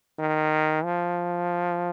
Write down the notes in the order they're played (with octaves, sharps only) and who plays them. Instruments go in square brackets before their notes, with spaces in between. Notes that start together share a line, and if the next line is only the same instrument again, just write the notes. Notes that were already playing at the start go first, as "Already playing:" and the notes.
[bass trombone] D#3
F3